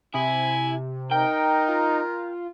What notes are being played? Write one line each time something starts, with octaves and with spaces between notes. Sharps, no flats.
C3 E4 G#5
D#4 A#4 G5
F4